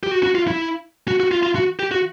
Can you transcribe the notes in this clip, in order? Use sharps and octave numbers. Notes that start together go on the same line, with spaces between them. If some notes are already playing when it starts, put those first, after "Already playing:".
G4
F#4
F#4
F4
E4
F#4
F#4
F4
F4
F#4
G4
F#4